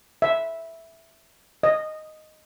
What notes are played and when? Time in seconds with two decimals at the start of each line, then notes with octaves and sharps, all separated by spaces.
0.22 E5
1.63 D#5